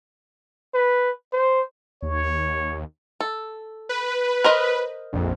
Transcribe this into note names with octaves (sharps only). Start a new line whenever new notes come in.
B4
C5
D#2 C#5
A4
B4
A#4 C5 D#5
A#1 F2